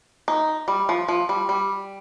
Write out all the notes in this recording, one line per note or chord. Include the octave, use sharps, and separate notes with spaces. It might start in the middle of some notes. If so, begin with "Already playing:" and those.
D#4
G3
F3
F3
G3
G3